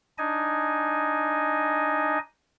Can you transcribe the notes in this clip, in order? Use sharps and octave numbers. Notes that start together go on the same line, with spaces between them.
D4 D#4 D#5 G#5